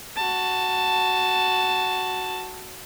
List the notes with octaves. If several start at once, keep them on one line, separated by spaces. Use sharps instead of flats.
F#4 A5